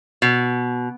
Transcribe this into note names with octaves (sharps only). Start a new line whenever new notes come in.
B2